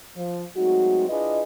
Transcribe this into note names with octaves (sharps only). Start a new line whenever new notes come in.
F3
F#3 G#3 A3 C4 D#4 F#4
D4 E4 F4 G#4 B4 D#5